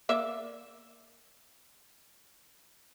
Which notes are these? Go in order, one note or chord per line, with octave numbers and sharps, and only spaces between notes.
A#3 D5 E5